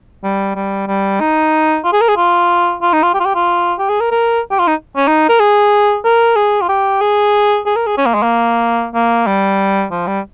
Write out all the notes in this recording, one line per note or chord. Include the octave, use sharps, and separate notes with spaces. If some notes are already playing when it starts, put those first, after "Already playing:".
G3
G3
G3
D#4
F4
G#4
A#4
G#4
F4
F4
D#4
F4
G4
F4
G4
F4
G4
G#4
A#4
A#4
G4
F4
D#4
C#4
D#4
A#4
G#4
A#4
G#4
F4
G4
G#4
G#4
A#4
G#4
C#4
A#3
G#3
A#3
A#3
G3
F3
G3